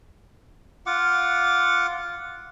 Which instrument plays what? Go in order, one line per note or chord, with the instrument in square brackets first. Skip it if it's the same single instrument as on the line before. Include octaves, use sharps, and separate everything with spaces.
[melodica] F4 F#5 D6